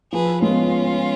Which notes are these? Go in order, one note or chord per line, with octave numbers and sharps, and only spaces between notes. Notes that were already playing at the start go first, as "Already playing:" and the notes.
F3 G#4 B4
G#3 B3 C#4 F4